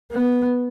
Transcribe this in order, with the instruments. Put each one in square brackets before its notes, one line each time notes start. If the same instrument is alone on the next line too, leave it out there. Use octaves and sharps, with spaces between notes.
[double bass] B3